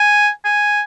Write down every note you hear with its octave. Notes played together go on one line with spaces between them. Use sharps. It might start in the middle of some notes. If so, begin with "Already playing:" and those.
Already playing: G#5
G#5